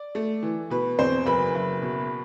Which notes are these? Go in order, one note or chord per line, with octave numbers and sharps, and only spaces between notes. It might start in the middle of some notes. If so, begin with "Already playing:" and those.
Already playing: D5
A3
E3
B2 B4
E2 C4 C5
F#1 B4 B5
F#1
B2